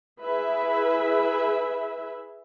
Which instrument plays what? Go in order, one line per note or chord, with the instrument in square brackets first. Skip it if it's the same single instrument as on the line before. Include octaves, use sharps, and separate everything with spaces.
[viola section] E4 G#4 B4 E5